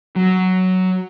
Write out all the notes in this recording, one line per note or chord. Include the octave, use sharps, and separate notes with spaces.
F#3